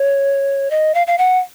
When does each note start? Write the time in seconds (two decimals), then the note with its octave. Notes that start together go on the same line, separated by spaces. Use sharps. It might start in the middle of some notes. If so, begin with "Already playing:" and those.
Already playing: C#5
0.71 D#5
0.94 F5
1.07 F5
1.18 F#5